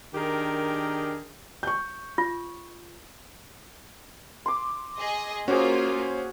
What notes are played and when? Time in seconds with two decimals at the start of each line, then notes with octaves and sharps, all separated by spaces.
0.14 D#3 D4 G4 G#4 A#4
1.63 C#6 G6
2.18 F4
4.46 C6 D6
4.98 G#4 D#5
5.48 A#3 C#4 F4 F#4 G#4 C5 D6